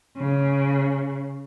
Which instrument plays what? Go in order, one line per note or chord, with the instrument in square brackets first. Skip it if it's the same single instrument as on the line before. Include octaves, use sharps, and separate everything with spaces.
[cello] C#3